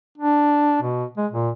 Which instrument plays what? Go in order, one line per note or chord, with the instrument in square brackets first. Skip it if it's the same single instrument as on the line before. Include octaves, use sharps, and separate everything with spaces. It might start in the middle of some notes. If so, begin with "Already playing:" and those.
[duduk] D4
B2
G#3
A#2